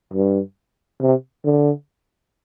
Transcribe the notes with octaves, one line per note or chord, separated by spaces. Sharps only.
G2
C3
D3